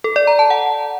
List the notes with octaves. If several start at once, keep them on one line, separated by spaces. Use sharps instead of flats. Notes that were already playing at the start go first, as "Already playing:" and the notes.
A4
D5
A#5
A5
F#5